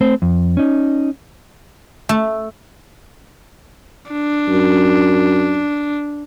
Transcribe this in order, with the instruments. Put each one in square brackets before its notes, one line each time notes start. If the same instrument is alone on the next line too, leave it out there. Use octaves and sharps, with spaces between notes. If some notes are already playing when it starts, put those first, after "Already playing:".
[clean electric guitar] A3 C4 C5
F2
C#4 D#4
[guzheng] A3
[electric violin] D4
[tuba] F#2